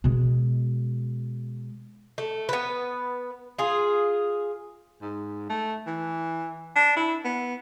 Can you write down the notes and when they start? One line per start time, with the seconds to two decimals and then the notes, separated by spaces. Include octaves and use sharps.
0.04 B2 G#3
2.18 A3
2.49 B3 B4
3.59 F4 G#4
5.02 G#2
5.49 A3
5.87 E3
6.76 D4
6.97 E4
7.24 B3